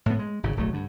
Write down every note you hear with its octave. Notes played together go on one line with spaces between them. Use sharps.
A2 B3
G#3
G#1 C#3
D1 B1 F#3 A3
G2 D3